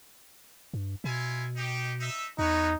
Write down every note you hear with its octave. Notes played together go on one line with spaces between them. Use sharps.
G2
B2 E4 F4 G#5
D#4 G4
D#4 E5
E2 D#4 F#4 B4 C#5